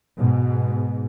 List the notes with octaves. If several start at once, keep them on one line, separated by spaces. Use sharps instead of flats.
G#2 B2